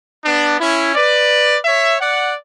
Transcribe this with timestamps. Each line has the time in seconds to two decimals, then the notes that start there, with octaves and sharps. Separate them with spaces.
0.24 B3 D4
0.60 C#4 E4
0.95 B4 D5
1.65 C#5 E5
2.01 D5 F#5